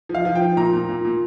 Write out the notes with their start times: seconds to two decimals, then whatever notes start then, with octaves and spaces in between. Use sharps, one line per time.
0.09 F3
0.15 F5
0.25 F3
0.35 G5
0.41 F3
0.57 A#2 A#5
0.73 A#2
0.89 A#2
1.05 A#2